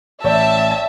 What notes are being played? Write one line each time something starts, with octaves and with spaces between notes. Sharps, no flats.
A1 C#5 D5 E5 G5 A5